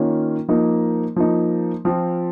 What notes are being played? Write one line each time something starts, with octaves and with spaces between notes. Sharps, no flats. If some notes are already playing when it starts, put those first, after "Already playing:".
Already playing: D#3 A#3 C#4 F4
F3 A#3 D#4
F3 A#3 D#4
F3 C4 F4